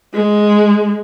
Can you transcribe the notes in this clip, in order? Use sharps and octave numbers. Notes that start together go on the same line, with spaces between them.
G#3